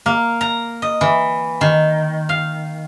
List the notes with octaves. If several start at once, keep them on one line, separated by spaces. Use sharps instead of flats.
A#3
A#5
D#5
E3
D#3
F5